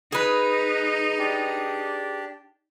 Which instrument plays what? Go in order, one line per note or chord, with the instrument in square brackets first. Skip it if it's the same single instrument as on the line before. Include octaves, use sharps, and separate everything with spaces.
[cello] D#4 [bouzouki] G#4 B4
[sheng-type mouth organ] D4 G4